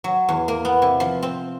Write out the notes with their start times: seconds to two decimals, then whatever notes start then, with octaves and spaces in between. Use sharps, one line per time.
0.04 F#3
0.29 E2
0.48 A#3
0.65 B3
0.82 C3
1.00 F3
1.23 C4